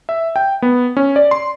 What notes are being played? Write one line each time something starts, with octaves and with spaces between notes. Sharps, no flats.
E5
G5
B3
C#4
D5
C6